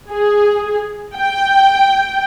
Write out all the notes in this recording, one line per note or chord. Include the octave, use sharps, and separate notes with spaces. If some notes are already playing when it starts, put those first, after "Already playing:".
G#4
G5